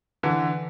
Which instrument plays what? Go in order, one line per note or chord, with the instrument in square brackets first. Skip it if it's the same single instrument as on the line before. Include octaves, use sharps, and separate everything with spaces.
[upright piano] D3 E3